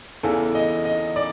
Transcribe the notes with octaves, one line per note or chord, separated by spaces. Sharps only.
E2 C#3 E3 A4
D#5
D#5
D5